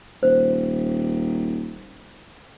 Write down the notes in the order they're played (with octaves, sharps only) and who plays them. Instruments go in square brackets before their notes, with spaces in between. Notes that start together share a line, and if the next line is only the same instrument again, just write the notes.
[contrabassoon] D#1 [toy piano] C5